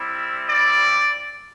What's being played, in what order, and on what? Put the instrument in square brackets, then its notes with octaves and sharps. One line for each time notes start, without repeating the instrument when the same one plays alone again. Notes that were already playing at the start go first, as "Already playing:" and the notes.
Already playing: [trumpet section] G3 C4 E4
D5